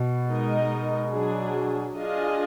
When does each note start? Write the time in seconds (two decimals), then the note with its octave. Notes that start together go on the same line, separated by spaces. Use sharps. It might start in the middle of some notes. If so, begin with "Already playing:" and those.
Already playing: B2
0.26 G#3 D#4 A#4 D#5
1.11 F#3 D4 G#4
1.96 D4 F4 G#4 D#5